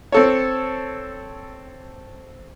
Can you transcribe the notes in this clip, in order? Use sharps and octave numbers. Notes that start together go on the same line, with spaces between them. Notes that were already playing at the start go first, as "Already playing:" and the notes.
C4 A4 C#5